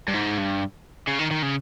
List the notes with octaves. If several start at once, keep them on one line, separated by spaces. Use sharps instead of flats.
G2
G#2
G2
C#3
D#3
D#3
C#3